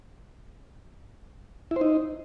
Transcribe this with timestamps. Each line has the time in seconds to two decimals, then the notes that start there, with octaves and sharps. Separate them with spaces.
1.71 E4
1.76 C5
1.81 D#4